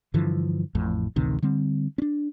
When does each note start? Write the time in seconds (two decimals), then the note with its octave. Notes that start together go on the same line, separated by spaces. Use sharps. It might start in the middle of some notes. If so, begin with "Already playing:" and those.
0.14 G2 D3 E3 F3
0.75 A1 F2 A2
1.16 A1 D2 C3 D#3
1.42 D3 G3 C4
1.98 C#4 D4